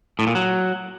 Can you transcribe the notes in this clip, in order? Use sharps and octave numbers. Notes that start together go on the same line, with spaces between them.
A2
A#2
F#3